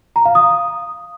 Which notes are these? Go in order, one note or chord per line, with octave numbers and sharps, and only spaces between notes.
A#5
F5
D#6